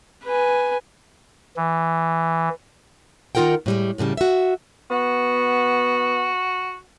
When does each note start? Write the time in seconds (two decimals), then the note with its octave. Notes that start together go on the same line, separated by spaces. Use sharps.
0.24 B4 G#5
1.56 E3
3.35 D#3 D#4 F4 A#4 F#5 G5
3.66 A2 G3 G#3
3.98 F#2 A2 C#3 G3
4.17 F#4 E5
4.91 B3 F#4